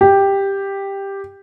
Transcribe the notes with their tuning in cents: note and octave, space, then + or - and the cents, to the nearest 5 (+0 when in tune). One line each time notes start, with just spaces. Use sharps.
G4 +5